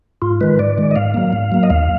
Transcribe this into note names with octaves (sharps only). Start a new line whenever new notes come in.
G#2 F4
D#3 G#3 B4
G#2 D5
D#3 G#3
D#5
G#2 F5
F#3 A#3
G#2
F#3 A#3
D#5
D#2 F5